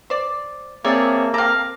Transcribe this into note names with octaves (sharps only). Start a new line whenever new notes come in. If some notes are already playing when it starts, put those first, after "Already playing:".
C5 D5
A#3 C4 G#4 A#4 C#5 D5 E5 A5
C4 A4 F5 A#5 D6